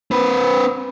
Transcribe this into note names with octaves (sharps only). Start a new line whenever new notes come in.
C4 B4